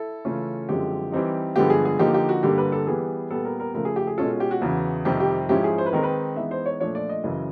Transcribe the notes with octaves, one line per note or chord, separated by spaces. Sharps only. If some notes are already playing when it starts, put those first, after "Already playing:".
Already playing: E4 A4
C#3 E3 A3 C#4 F4
F#2 D3 F3 G#3 C4 G4
E3 G3 C4 D#4
G2 D3 F3 G#3 B3 G4
G#4
G#4
D3 F3 A#3 D#4 G4
G4
F#4
G2 D3 G3 A#3 G4
B4
A4
E3 G3 B3 G#4
A#2 G3 B3 A4
A#4
A#4
C#3 F3 A3 A#4
G#4
G4
G#4
B2 G#3 C#4 F4 A4
G4
F#4
E2 C#3 E3
F2 C3 D#3 G3 G4
G4
G#2 F3 G#3 C#4 E4 G4
G#4
C5
B4
D#3 G#3 C4 D#4 A#4
B4
E3 G#3 B3 D#4 E5
C5
C#5
A#2 F3 A3 D4 F4 C#5
D5
D#5
F#2 C#3 E3